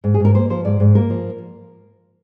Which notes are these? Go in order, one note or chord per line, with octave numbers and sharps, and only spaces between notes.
G#2
G#4
G#2 A#4
A#3 C5
F3 C5
G#2 D5
G#2
A#3 A#4
F3